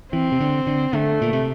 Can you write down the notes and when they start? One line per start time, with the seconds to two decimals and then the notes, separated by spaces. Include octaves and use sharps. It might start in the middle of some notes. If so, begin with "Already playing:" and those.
0.13 E3 C4
0.32 C3
0.41 D3
0.67 D3
0.93 D3 A3
1.22 A#2
1.33 C3